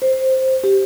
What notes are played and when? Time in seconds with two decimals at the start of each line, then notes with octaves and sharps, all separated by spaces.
0.02 C5
0.64 G4